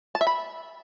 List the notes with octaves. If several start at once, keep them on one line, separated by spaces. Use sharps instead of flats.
A5
E5
B5